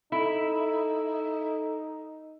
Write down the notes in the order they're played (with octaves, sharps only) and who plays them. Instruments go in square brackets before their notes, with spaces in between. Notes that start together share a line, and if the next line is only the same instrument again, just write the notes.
[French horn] D#4 [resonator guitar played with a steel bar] E4 [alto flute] A4